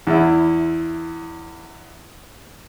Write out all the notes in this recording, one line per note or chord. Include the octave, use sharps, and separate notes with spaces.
E2 E4